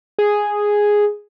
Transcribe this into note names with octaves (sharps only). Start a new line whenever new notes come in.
G#4